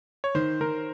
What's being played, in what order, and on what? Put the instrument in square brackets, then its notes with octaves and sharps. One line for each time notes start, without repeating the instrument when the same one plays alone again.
[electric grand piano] C#5
[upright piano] D#3 [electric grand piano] C5
[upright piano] D#3 [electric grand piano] A#4